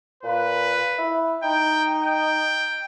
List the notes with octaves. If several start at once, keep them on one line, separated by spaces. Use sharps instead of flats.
A#2 B4
E4
D#4 G5
G5